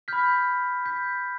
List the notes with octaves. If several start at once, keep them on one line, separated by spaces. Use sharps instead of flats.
B5 F6 G6 B6
G6 B6